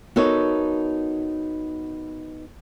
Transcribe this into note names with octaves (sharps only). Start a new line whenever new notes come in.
B3 D#4 F#4 A4 A#4 C#5